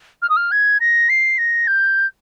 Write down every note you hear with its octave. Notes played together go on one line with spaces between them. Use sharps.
F6
D#6
F6
G#6
A#6
C7
A#6
G6